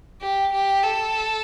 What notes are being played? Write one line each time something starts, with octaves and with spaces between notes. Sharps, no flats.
G4
G4
A4